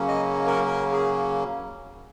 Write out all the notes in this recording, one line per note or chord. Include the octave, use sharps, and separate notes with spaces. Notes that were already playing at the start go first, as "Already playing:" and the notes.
Already playing: C#3 F#3 A#3 C#4
D#5
A#4
A#4
G#4